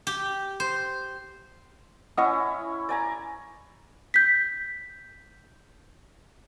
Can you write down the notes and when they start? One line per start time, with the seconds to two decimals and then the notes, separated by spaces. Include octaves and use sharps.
0.07 G4
0.60 C5
2.18 C#4 E4 D#5 F#5 D#6
2.89 D5 G#5 A#5
4.14 G6 B6